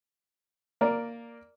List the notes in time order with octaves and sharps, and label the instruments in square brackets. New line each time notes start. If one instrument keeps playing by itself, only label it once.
[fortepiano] A#3 A#4 D5